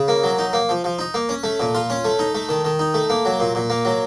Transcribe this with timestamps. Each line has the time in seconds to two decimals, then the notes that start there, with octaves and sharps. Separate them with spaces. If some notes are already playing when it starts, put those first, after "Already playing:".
Already playing: C#3
0.08 A#3
0.23 F#3
0.39 D#4
0.53 A#3
0.69 F3
0.84 F3
0.99 D#4
1.14 A#3
1.29 C#4
1.43 A3
1.60 A#2
1.75 F4
1.90 C#4
2.05 A3
2.19 D#4
2.35 A3
2.49 D#3
2.65 D#3
2.79 D#4
2.94 A3
3.10 A#3
3.25 F#3
3.40 A#2
3.55 A#2
3.70 A#3
3.85 F#3